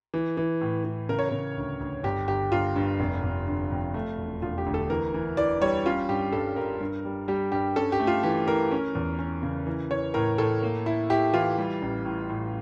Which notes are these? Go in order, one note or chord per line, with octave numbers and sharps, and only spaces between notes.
E3
E3
A2
E3
C#3 A#4
C#5
C#3 A#4
D2
D2
G1 G4
G1 G4
G1 F4
G2
F1
F1
D3
F2
A3
E1
E1 F4
G4
D2
A4
E3 A#4
E3
E3 D5
G3 C#5
C#4 F4
G2 G4
G2 A4
G2 A#4
G2
G3
G3 G4
G2 G4
C#4 A4
G4
A3
F4
E3 G4
E3 A#4
C#4
E2
C#4
C#3
E3
E3 C#5
A2 A#4
A2 A4
A#3
E4
E4 G4
E3 F4
G3
A1
A2
A2